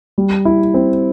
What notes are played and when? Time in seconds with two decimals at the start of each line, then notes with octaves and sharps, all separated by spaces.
0.18 G3
0.45 E4
0.74 C4